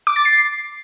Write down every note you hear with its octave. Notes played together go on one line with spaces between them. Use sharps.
D6
A6
C7